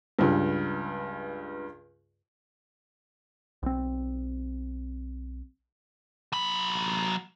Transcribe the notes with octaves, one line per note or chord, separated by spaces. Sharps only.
C#2 G2
B1 C4
F#3 B5